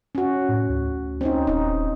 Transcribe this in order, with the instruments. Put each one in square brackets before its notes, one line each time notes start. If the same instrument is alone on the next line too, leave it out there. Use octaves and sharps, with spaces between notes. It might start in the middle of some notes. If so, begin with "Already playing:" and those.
[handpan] C#4 F#4
[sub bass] A2
D2
[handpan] C4 C#4 D#4
[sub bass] D#1 [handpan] D#4